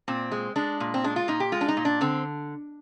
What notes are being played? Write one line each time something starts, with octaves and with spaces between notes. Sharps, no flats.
A#2 C4
G#3
G#3 D4
A#2
C4
G#3 D4
F4
A#2 D#4
G4
G#3 F4
D4
D#4
A#2
D4
D3 C4